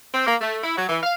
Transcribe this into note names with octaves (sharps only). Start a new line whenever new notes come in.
C4
A#3
A3
E4
F#3
E3
F5